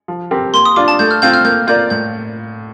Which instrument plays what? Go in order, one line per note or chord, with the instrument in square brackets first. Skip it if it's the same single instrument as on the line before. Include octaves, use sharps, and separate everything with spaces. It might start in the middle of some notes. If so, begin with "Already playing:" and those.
[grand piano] F3
C4 G4 A#4
[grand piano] A#3 [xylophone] C6
[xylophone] D#6
[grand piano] D4 F4 [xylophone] D6
[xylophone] A5
[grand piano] A3 [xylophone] G6
[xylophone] F6
[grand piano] C4 F4 [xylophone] G6
[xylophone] F6
[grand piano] A#3 [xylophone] G6
[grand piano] F4 A#4 D5 [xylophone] G6
[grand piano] A2 [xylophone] G6